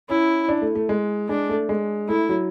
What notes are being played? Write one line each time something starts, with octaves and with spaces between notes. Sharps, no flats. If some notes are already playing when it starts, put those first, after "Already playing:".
C#4 E4
D4
A3
A3
G#3
G#3 D4
A3
G#3
A3 E4
F#3